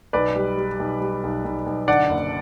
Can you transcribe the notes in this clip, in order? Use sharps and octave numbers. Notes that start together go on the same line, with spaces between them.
B1 B4 D5
G3
G3
B1
G3
B1
B1
B1
D3 D5 F#5
F#1